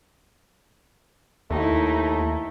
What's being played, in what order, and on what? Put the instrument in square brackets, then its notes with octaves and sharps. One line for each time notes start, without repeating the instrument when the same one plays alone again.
[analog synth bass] D#2 [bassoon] A3 [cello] D#4 E4